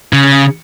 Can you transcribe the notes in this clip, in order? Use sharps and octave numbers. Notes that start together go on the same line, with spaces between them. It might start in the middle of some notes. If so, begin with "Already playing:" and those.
C#3